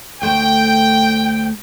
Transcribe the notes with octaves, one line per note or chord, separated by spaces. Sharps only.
D2 A3 C5 G5